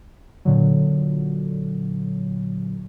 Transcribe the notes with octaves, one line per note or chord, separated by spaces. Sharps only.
A#2 D3 F#3